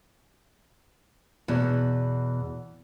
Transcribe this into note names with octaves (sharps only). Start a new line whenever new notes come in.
E2 B2